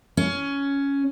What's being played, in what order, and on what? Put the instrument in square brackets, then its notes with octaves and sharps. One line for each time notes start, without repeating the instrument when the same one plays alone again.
[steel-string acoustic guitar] C#4